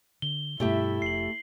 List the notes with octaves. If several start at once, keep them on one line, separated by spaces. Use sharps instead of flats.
D3 G7
G2 B2 A3 E4 G4 E5
F1 C7 F#7